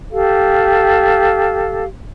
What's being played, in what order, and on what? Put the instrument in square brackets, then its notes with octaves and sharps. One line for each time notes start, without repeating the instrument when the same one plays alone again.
[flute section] G4 A4 F5